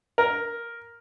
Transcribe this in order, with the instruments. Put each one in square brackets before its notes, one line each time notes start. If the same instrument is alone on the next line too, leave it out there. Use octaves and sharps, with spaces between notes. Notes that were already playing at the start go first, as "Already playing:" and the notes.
[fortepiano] A#4